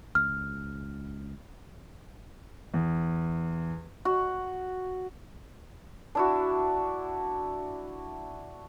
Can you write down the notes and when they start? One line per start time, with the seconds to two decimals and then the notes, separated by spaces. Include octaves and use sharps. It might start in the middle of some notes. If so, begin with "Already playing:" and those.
0.15 C#2 F6
2.74 E2
4.05 F#4
6.15 D4 E4 F#4